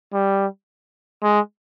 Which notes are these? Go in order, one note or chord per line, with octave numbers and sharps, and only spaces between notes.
G3
G#3